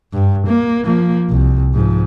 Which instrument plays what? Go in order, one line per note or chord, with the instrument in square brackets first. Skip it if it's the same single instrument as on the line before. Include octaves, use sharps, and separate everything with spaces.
[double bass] G2
A#3
F3 A#3
C2
G#2 F3